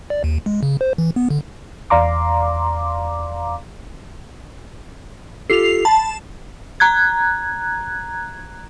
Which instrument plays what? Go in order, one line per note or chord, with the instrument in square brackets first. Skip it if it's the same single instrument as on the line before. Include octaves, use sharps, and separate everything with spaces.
[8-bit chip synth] D5
D#2
G#3
C#3
C5
E3
B3
D3
[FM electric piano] E2 D5 F5 A#5 C6 D6
[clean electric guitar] F4 G4 A4 [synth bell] C7 F7
[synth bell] A5 [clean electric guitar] B5
[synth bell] A#5 F#6 G#6